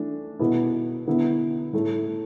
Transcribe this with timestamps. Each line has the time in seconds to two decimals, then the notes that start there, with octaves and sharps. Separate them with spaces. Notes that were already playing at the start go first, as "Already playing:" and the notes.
Already playing: E3 A3 D4
0.39 B2 B3 E4
1.07 D3 B3 E4
1.73 A2 A3 E4